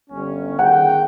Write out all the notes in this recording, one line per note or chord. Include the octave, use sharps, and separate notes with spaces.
G1 C#4
D#3 G#4 F#5 G5